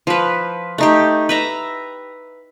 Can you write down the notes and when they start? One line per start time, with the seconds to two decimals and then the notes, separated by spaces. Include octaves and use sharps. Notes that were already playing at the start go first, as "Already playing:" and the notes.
0.07 F3 B4
0.78 A3 D#4 G4
1.29 B4 E5 A#5